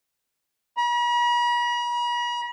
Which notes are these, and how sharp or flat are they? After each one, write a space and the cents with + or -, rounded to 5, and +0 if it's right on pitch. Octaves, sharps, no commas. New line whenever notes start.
B5 -45